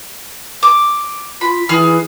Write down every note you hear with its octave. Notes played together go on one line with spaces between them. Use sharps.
D6
F4 B5
E3 G#4 F6